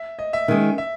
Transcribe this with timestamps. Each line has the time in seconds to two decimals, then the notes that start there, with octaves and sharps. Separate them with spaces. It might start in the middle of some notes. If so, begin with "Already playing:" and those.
Already playing: E5
0.19 D#5
0.33 E5
0.48 D#3 G#3 C#4
0.78 E5